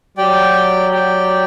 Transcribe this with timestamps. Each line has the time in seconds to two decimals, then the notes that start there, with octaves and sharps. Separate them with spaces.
0.17 F#3 G4 D5 G5
0.90 G4 D5 G5